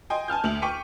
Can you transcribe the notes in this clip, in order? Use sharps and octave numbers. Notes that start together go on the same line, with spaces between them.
D#5 G5 G#5 C6
G#5 A5 F6 G6
D2 E5 F7 F#7
G5 C#6 D6 B6 C#7 D#7